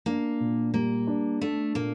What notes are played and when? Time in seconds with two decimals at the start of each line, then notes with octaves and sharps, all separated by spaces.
0.06 A#3 D4
0.40 A#2
0.74 G3 A#3
1.07 D4
1.41 A3 D4
1.75 A#2 A#3